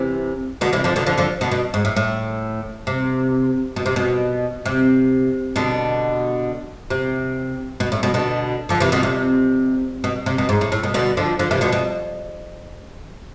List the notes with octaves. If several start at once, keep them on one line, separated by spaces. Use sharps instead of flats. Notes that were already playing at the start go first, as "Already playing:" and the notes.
Already playing: C3 E3
B2 D3
C3 E3
D3 F3
B2 D3
D3 F3
D3 F3
B2 D3
B2
G#2
A2
A2
C3
B2
C3
B2
C3
B2 D3
C3
B2
A2
B2
B2 D3
D3 F3
C3 E3
B2 D3
C3
B2
C3
B2
G#2
A2
A2
B2
B2 D3
D3 F3
D3 F3
C3 E3
B2 D3
B2